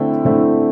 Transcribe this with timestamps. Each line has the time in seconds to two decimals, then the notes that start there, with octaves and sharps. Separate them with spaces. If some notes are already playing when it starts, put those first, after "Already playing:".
Already playing: D3 A3 C4 E4 G5
0.25 D3 A3 C4 E4